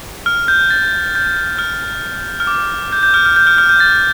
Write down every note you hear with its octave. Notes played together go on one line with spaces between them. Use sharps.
F6
G6
A6
G6
F6
F6
D6
G6
G6
F6
F6
G6
F6
F6
G6
A6